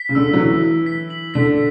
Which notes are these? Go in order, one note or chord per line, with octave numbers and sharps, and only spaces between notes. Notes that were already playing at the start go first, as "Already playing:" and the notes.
Already playing: B6
C#3
D3 E6
F#3
E3 E6
E6
B6
F#7
D3 B6